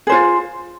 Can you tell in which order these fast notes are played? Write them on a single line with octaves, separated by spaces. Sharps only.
G#4 C5 F4